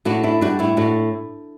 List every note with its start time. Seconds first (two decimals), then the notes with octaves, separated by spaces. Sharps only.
0.05 A2 D4 F#4
0.23 D4 E4
0.41 G3 D4 F#4
0.59 A2 E4
0.77 A2 D4 F#4